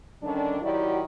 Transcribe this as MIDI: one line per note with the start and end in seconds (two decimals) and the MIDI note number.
0.23 0.59 50
0.23 0.59 51
0.23 0.59 55
0.23 0.59 61
0.23 0.59 62
0.62 1.02 51
0.62 1.02 54
0.62 1.02 64
0.62 1.02 66
0.62 1.02 67
0.62 1.02 74